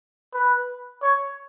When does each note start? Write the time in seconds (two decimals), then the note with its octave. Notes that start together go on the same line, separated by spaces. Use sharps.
0.34 B4
1.02 C#5